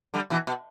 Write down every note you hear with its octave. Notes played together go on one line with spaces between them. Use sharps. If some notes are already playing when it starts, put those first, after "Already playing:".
D3 G3
B2 E3
B2